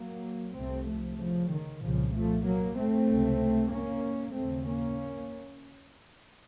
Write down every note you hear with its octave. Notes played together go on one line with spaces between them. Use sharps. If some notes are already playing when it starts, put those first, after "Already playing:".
Already playing: F#3 A#3
C2 C3 A3 C4
F3 A3
C#3 F3
D#3
C2 A#2 C#3 F3
F3 A3
F#3 A#3
A3 C4
C#2 C3
A#3 C#4
D#2 C#3 A3 C4
A#3 C#4